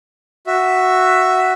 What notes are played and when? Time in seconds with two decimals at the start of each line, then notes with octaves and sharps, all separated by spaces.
0.47 F#4 E5